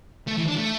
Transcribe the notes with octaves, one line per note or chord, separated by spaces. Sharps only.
A3
E3
D4
A3